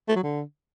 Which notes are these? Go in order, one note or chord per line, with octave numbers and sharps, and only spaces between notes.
A3
F#3
D3